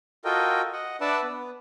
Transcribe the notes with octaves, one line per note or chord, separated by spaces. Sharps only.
F4 F#4 A4 A#4 D#5 G5
D#5 F#5
D4 B4 D5 E5 F#5 A5
B3